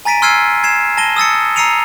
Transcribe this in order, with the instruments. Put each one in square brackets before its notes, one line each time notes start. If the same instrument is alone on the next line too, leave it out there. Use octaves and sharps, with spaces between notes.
[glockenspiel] G#5 A#5 A6 B6 D7 D#7
C6 E6 F6 G#6 C7 D#7
G#6 C7 E7
A5 A#6 D#7 G7
D#6 E6 A6 C#7
A#5 E6 C7 C#7 D#7 F7